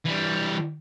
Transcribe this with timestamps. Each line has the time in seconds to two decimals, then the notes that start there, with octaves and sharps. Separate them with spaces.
0.06 E3 G3